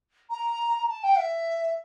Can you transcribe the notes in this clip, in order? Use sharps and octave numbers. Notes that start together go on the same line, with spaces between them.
A#5
A5
G5
E5